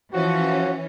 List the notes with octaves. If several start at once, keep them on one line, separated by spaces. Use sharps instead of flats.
E3 F3 C#4 F#4